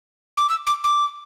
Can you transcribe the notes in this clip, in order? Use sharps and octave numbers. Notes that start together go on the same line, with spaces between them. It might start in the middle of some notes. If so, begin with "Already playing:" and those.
D6
E6
D6
D6